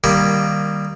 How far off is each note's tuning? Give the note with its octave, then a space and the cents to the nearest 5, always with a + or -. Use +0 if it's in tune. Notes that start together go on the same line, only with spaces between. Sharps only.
D#3 -15 G3 +0 A#3 +0